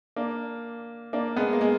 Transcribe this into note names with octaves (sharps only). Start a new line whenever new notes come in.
A#3 D4
A#3 D4
G#3 B3
A#3
G#3